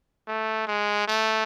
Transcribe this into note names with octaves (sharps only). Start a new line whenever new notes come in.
A3
G#3
A3